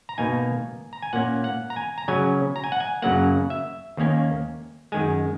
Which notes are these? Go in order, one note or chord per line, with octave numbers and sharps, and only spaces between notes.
A#5
B2 A#3 D#4 G#5
A#5
G#5
A#2 A#3 C#4 F#5
F#5
A#5
G#5
A#5
C#3 F#3 C#4 G#5
A#5
G#5
F#5
G#5
F#2 C#3 F#3 A#3 F#5
E5
D#2 D#3 A#3 C#4
F#2 D#3 G#3 G#5